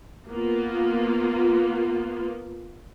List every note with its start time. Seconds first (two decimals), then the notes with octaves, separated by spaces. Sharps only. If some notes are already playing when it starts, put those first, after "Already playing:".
0.28 A#3 B3 F4